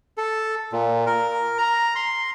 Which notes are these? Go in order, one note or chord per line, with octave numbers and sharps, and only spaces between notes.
A4
A#2
A#4
A#5
C6